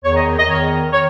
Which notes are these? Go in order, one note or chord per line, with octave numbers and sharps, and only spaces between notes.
E2 D#3 C#5
D#5
D#5
E2 D#3 C#5
D#3 C#5